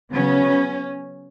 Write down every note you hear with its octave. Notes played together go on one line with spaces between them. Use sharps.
C#3 F#3 B3 C#4